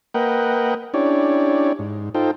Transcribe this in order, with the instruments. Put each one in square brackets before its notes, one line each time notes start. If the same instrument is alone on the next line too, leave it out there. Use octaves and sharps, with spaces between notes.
[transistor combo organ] A#3 A#4 B4 D#5 F#5 G5
C#4 D4 E4 G4 C#5 D5
G#2
D#4 F4 A4 C5 G5